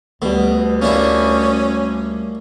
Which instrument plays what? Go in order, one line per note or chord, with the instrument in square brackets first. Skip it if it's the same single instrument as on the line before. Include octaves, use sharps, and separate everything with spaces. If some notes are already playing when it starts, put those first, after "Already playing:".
[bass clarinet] D2 [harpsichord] B2 [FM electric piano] G3 A3
[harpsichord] A#3 D4 E4 [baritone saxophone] C#4